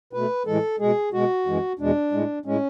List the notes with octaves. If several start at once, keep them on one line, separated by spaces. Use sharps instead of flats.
B2 A3 B4
A2 E3 G#3 A4
B2 G#3 G#4
B2 G#3 F#4
F#2 E3 G#3
E2 B2 G#3 D4
A2 G#3
A2 G#3 C#4